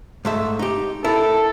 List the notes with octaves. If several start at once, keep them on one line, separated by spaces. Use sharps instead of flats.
G#2 A3 E5
D#4 G4
E4 A4 A#4